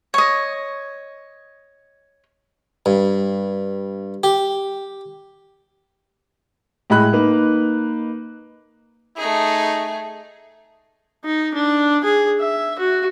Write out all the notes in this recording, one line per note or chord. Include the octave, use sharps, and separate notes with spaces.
C#5 D#5
G2
G4
A2 G#3 D#5 B5 F#6
A#3 D#4 B4
A3 D#4 G#4
D#4
D4
G#4
E5
F#4